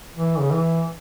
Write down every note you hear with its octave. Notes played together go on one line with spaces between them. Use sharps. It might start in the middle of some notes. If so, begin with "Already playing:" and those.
E3
C#3
E3